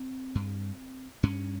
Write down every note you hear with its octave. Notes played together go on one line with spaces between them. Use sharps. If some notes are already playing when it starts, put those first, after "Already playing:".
Already playing: C4
G2
G2 C#4